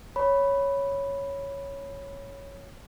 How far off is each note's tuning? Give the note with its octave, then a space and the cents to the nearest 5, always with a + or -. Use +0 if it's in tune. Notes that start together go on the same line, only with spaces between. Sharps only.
C#5 +0 B5 +0